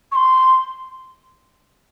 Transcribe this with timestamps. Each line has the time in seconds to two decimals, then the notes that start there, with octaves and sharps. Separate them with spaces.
0.11 C#6
0.15 C6